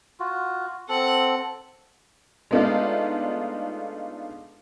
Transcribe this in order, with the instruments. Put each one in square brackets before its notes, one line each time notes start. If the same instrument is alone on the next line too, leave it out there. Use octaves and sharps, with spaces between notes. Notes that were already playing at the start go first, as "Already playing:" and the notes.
[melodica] F4 F#4
[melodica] C4 A4 [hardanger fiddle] F#5
[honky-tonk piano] G#3 A3 B3 D4 D#4 F4